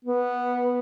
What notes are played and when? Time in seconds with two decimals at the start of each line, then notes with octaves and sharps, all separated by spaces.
0.05 B3